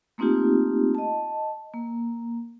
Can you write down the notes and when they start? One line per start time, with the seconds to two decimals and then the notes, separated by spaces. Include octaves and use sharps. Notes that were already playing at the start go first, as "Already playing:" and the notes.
0.18 A3 A#3 C4 D#4 F4 G4
0.95 D#5 A5
1.74 A#3